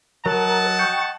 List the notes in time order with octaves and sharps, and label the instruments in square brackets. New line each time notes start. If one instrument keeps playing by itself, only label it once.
[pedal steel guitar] F#3 [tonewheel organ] A#4 [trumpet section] D#5 F#5 A5
[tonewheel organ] G5 C#6